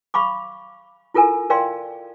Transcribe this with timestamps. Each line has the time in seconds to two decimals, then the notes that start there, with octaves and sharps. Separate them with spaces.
0.14 F5 B5 C#6 D6
1.14 E4 F4 A4 A#4 G#5
1.50 A#4 D5 F5 G5 C6